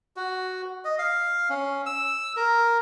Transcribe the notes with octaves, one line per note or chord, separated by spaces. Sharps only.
F#4
D#5
F5
C#4
E6
A#4